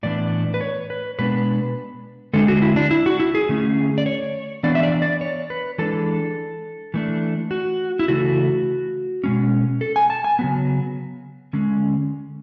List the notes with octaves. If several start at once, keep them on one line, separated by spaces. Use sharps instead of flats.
A2 E3 B3 D4 D5
B4
C#5
B4
B2 G#3 B3 D4 B4
D3 G#3 D4 A4
F#4
E4
D4
E4
F#4
E4
G#4
D3 A3 C#4
D5
C#5
E3 B3 D4 D5
E5
D5
D5
C#5
B4
E3 G#3 D4 A4
E3 A3 D4
F#4
E4
C#3 E3 A3 F#4
B2 G#3 C#4
A4
G#5
A5
G#5
C#3 F#3 B3
D3 G#3 C#4